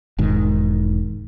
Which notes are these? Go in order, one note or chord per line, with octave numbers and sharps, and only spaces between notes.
E1 G#2 D#3